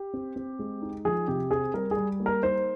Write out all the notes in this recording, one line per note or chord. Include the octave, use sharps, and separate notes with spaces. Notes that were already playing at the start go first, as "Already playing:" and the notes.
Already playing: G4
C4
C4
G#3
D#4
F3 G#4
C3 G4
C4 G#4
G3 A#4
G#4
G3
A#3
A#4
D#4 C5